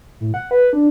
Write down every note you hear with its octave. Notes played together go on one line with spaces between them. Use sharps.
A2
F#5
B4
D4